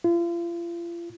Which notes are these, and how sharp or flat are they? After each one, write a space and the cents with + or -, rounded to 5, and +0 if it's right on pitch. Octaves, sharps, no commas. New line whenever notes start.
F4 -40